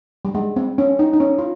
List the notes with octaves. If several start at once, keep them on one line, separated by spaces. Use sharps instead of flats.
G3
G#3
C4
C#4
D#4
D#4
C#4
F4